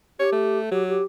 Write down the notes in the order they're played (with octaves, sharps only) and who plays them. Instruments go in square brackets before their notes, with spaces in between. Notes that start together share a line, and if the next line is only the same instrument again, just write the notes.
[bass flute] G4 [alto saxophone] C#5
[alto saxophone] A3
[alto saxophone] F#3 [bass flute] G4
[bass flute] G4